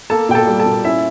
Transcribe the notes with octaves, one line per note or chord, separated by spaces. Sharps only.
A#3 A4 A5
A#2 G5
A4 A5
G3
A4 A5
A#2
C#4 E4 E5